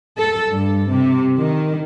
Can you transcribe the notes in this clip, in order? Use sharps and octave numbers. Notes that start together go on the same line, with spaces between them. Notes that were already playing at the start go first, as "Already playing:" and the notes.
A4
G2
C3
D#3